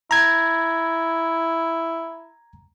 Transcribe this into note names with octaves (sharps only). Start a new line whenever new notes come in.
E4 A#5 G#6